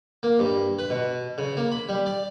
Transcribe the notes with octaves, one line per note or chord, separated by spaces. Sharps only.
A#3
G2
B4
B2
C#3
A#3
B5
G3
D5